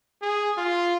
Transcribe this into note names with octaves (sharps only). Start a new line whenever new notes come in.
G#4
F4